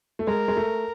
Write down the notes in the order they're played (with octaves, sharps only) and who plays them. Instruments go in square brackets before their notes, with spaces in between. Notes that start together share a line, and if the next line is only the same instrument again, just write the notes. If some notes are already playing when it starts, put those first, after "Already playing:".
[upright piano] A3
[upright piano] G#3 [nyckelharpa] A#4
[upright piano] G#3
A3